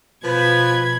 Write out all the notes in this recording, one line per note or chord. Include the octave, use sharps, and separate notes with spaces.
B2 F3 B4 B5 G#6